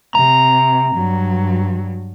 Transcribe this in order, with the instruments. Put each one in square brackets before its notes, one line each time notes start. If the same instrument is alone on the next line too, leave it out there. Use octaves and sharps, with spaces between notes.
[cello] C3 [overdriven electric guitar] A#5
[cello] G2 F#3